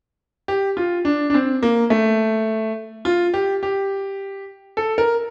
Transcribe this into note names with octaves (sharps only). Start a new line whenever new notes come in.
G4
F4
D4
D4
C4
A#3
A3
F4
G4
G4
A4
A#4